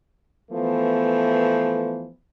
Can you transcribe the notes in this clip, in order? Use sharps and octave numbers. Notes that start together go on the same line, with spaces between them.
E3 F3 A3 B3